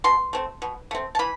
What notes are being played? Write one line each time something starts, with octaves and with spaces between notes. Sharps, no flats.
B2 C6
A3 C4
B2
A3 C4
A5
E3 B5